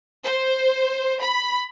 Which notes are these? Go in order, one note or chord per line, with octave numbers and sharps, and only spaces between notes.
C5
B5